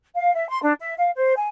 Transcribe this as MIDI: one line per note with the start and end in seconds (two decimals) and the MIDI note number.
0.15 0.32 77
0.34 0.48 76
0.48 0.61 84
0.62 0.73 62
0.80 0.94 76
0.98 1.10 77
1.17 1.33 72
1.36 1.47 80